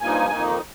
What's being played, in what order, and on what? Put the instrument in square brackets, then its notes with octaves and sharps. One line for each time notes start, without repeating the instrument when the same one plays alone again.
[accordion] G2 F3 A#3 D#4 G#5
F2 D#3 A#3 D#4